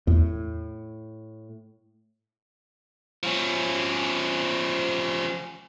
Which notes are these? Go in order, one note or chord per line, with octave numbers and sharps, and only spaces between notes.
E2 A2
F3 C#4